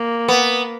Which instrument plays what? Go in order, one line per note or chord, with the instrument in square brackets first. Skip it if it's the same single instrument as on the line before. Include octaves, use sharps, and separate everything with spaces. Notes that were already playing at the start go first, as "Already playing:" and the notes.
Already playing: [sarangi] A#3
[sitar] B3